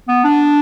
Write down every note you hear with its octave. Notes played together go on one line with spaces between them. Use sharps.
B3
D4